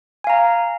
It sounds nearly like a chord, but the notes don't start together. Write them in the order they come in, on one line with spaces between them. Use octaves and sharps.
G#5 F5 A#5